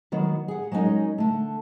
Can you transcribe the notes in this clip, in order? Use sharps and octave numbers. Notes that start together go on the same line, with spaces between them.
D#3 F#3 B3
G#4 F#5
F#3 G#3 C#4 D#4 A#4
D3 A3